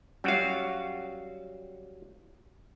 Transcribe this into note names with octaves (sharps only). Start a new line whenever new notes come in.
F#3 G3 C#4 F#4 F5